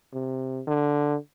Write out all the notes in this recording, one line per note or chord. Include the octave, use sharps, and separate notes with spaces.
C3
D3